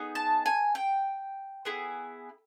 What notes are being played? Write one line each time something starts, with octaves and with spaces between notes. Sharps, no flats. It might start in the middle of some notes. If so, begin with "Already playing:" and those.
Already playing: B3 D#4 G#4
A5
G#5
G5
B3 E4 G#4